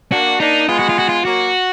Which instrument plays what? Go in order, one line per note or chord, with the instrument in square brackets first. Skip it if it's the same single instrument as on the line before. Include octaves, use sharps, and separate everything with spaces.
[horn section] A#3 D4 [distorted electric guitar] F#4
[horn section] A#3 D4 [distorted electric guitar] D#4
[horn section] G#3 B3 [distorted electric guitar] F4
[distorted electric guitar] F#4
F4
F#4
F4
[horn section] F#3 A#3 [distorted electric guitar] F#4